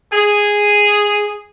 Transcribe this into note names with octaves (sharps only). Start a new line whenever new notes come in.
G#4